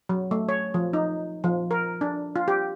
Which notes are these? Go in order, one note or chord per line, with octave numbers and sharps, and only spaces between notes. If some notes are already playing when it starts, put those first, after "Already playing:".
F#3
A3
C#5
F3
D#4
F3
A#4
D4
F4
G4